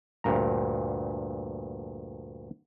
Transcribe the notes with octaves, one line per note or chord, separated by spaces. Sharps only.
D2 G2 A#2 A#5